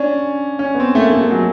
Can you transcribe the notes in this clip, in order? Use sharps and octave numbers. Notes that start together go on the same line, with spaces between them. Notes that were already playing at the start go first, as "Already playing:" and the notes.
Already playing: C#4 D4
C#4
B3
C4
A3
A#3
A3
G#3
F#3